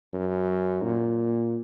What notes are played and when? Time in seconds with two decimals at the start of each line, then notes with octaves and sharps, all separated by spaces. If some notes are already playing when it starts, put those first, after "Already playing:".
0.13 F#2
0.83 A#2